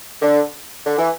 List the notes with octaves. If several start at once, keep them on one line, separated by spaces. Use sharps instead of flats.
D3
D3
E3